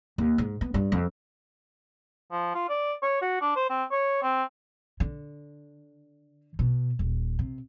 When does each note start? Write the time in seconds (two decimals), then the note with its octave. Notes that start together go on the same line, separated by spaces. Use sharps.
0.18 D#2
0.38 G#2
0.61 B3
0.74 G2
0.92 F2
2.32 F3
2.55 F4
2.69 D5
3.03 C#5
3.22 F#4
3.41 D4
3.56 C5
3.70 C4
3.91 C#5
4.23 C4
5.00 D3
6.59 B2
6.99 D#1
7.39 C3